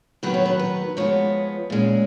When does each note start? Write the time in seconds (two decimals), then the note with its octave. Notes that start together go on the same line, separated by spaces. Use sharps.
0.23 D#3 F#3 B3 B4
0.34 C#5
0.45 B4
0.59 B4
0.97 F3 G#3 B3 C#5
1.70 A#2 G#3 C#4